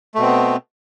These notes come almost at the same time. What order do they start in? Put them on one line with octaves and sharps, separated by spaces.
A3 B2 C4 B3